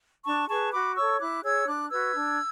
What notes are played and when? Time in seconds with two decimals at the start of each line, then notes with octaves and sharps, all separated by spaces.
0.24 D4 A5 C#6
0.48 G#4 B4 A5 C#6
0.72 F#4 B5 D6
0.95 A4 C#5 C#6 E6
1.19 E4 D6 F#6
1.43 G#4 C#5 E6 G#6
1.66 D4 D6 F#6
1.90 F#4 B4 E6 G#6
2.14 D4